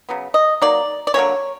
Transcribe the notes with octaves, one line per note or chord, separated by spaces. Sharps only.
C#3 F#3 B3
D#5
F#3 A#3 D#4 D5
D5
D3 F#3 A#3 C#4 C#5